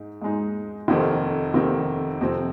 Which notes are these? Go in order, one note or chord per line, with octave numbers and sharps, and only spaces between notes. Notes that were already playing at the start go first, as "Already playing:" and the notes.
Already playing: G#2 D#4
G#2 G#3 D#4
F1 F2 C3 D#3 C4
F1 F2 C3 D#3 C4
F2 C3 F3 C4